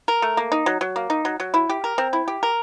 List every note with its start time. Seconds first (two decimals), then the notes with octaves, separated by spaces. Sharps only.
0.08 A#4
0.22 A3
0.37 A#3
0.52 D#4
0.66 F#3
0.81 F#3
0.96 A#3
1.10 D#4
1.25 F#3
1.40 F#3
1.54 E4
1.70 G4
1.84 A#4
1.98 C4
2.13 E4
2.28 G4
2.43 A#4